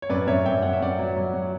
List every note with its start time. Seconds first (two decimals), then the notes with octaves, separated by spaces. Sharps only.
0.02 C#5
0.10 F#2 B4 D5
0.27 F#2 C#5 E5
0.45 F#2 E5 G5
0.63 F#2 F#5
0.73 E5
0.81 F#2 D5 F#5
0.99 F#3
1.17 F#3
1.34 F#3